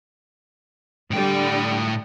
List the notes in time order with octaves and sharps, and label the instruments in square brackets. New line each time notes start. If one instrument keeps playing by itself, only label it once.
[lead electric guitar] A2 G5 [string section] D3 G3